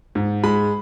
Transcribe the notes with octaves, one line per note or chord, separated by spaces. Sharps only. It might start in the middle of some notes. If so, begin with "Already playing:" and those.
G#2
G#3 B5